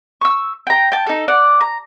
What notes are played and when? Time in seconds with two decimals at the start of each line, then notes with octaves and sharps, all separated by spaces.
0.21 C#6 E6
0.67 G5 A#5
0.92 G5 A5
1.06 D#4 A4
1.28 D5 F#5
1.61 A#5